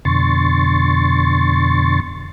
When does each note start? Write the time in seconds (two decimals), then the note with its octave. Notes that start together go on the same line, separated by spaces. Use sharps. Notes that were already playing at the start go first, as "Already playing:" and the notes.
0.05 F2 B2 D3 C6 C#6 A6